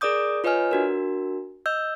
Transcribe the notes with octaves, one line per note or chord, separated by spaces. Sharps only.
G#4 A#4 D5 D6 D#6 G6
F4 B4 C#5 D#5 G#5 F6
D4 F#4 A#4
D#5 E6 G6